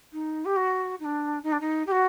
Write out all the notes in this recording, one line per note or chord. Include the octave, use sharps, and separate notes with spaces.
D#4
G4
F#4
D#4
D4
D#4
D4
D#4
G4
F#4